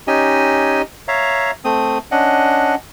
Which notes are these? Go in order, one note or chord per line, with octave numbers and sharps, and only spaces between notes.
C#4 D#4 G4 D#5 G#5
C#5 E5 F5 A#5
A3 C4 D#6
C#4 D4 D#5 F#5